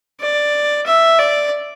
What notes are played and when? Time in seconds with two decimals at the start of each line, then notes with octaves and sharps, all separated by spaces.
0.21 D5
0.87 E5
1.20 D5